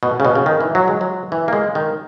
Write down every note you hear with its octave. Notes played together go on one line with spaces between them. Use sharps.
B2
C#3
B2
C#3
D#3
E3
F#3
G#3
F#3
E3
A#3
G#3
D#3